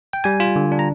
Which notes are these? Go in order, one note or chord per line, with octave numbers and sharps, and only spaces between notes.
G5
G3 G#5
F4
D3
D4
A#5